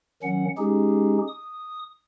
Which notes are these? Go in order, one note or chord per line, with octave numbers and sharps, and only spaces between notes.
D#3 F#3 C#4 F#5
G#3 C#4 D#4 G4 G#4
D#6